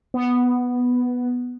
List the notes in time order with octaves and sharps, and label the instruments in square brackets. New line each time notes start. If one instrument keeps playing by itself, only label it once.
[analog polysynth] B3